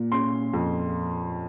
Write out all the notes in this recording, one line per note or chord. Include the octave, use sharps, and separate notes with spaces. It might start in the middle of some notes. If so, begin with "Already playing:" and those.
Already playing: A#2
C#4 C6
F2